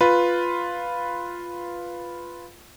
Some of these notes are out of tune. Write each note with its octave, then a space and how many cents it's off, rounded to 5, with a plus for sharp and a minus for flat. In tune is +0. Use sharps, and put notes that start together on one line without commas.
F4 +0 B4 +0